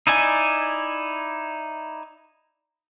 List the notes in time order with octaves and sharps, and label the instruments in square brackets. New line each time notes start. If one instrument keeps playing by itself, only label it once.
[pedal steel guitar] D#4 E4 D5 G#5